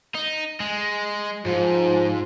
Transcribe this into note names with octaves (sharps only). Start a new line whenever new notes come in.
D#4
G#3
G#2 F3